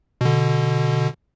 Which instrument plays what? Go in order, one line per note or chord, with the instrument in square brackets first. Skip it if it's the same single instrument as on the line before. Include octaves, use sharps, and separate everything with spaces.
[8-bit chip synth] B2 D3